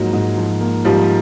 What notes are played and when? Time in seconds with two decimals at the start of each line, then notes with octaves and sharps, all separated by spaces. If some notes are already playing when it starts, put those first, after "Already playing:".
Already playing: G#2 F3 F#3 A#3
0.13 G#2
0.37 F3
0.61 A#3
0.85 G#2 F3 G3